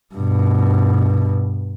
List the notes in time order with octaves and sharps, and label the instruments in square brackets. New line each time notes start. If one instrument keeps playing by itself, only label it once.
[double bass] G2 B2